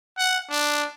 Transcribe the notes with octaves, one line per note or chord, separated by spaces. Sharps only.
F#5
D4